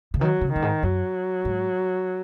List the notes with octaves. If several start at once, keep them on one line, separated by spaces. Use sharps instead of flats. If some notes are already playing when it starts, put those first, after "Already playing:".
C#3
D#3 F#3
C#3
F#2 D#3
G#2
F#2 F#3
G#2